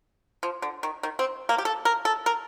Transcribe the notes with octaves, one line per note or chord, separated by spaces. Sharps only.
F3
D3
D#3
D#3
C4
A#3
G4
A4
A#4
A4
A#4